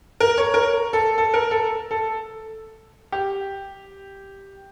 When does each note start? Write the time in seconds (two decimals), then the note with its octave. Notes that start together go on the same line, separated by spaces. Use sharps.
0.20 A#4
0.38 C#5
0.54 A#4
0.93 A4
1.18 A4
1.34 A#4
1.51 A4
1.91 A4
3.12 G4